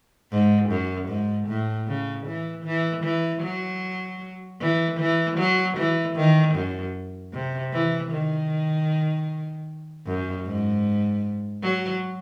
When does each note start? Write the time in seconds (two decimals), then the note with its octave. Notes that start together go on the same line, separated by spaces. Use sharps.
0.31 G#2
0.70 F#2
1.09 G#2
1.48 A2
1.88 C#3
2.27 E3
2.65 E3
3.04 E3
3.43 F#3
4.61 E3
5.00 E3
5.38 F#3
5.78 E3
6.16 D#3
6.55 F#2
7.33 C3
7.73 E3
8.12 D#3
10.06 F#2
10.46 G#2
11.63 F#3